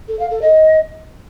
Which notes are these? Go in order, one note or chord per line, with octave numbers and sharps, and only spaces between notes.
A4
F5
A4
D#5